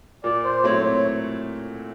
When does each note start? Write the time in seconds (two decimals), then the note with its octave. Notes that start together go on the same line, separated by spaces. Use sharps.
0.24 A#2 D5
0.44 C5
0.64 F#3 A3 C4 E4 C#5
0.84 C#5